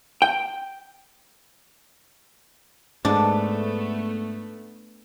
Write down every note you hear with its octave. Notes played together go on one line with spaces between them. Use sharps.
G5
G#2 A3 B3 D4